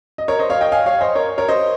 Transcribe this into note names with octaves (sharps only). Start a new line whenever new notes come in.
D#5
A#4 C#5
C5 D#5
C#5 F5
D#5 G5
F5 G#5
C#5 F5
C5 D#5
A#4 C#5
A#4 C#5
C5 D#5